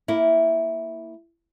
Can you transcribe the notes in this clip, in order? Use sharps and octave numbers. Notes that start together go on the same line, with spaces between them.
A#3 E4